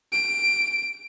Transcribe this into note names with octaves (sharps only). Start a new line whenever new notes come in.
D7